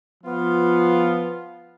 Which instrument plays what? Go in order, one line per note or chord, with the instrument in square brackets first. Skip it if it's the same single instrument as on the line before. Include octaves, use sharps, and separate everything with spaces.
[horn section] F3 B3 F4